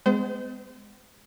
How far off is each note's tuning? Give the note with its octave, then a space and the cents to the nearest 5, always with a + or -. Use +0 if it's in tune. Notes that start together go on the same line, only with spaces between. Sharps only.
G#3 +0 B3 +45 C5 -25